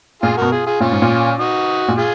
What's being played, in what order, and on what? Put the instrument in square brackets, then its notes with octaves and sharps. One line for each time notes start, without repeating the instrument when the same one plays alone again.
[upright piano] A#2 [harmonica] F4 G#4
[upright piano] B2 [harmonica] F#4 A#4
[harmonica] F4 G#4
F4 G#4
[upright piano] A#2 [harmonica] C#4 F4
[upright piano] G#2
A#2
[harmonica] D#4 F#4
[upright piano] A#2
[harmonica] F4 G#4